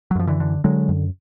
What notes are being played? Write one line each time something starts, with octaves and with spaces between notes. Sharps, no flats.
F#3
F#2 F3
D3 E3
D3
D3 F#3 G#3
F#2